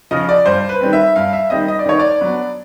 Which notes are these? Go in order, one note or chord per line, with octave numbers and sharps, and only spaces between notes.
C#3 F3 D#5
D5
G2 C5
B4
D#3 G3 C4
E5
G2 F5
E5
D#3 G3 C4 D#5
D#5
D5
D#3 C#5
D5
F#3 B3 D4